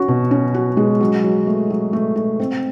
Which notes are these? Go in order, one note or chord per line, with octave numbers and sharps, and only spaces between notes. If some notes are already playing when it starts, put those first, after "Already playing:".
Already playing: C#4 F#4
B2
C#4
F#4
G#3
F#3
F#3
A3
F#3
A3
A3
C4